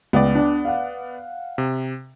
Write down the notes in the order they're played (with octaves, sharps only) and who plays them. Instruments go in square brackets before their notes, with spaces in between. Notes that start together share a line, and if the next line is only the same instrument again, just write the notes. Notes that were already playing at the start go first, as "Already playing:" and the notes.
[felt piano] C#2 [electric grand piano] B3 D5
[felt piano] D4
F5 F#5
[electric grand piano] C3